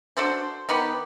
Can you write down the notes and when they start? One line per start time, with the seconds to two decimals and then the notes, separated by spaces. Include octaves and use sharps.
0.17 D4 F#4 A4 C5
0.69 D#3 B3 G4 B5